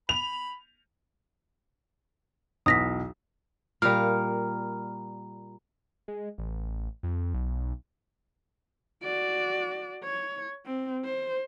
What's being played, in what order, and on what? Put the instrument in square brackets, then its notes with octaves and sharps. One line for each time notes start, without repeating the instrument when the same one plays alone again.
[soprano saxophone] B5 [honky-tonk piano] F7
[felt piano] B1 E2 F#3 [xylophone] D#6 A#6 B6
[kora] A#2 G3 [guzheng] A#4 F5 [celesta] F6
[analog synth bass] G#3
A1
F2
B1
[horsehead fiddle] F#4 D5
C#5
C4
C5